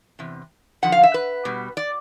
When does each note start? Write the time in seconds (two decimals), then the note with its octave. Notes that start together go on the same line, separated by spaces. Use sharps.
0.19 E2 C3
0.82 F#2 D3 F3 F#5
0.92 F5
1.03 E5
1.14 B4
1.45 B2 G3
1.77 D5